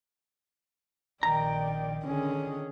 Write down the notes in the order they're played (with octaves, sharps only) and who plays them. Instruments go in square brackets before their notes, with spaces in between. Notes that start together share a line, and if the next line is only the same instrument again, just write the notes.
[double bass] A#1 D#3 [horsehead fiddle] D5 G5 [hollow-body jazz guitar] A#5
[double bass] D3 D#3 [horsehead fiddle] C#4 G#4